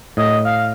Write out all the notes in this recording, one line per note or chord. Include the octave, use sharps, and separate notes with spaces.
A2 D#5
F5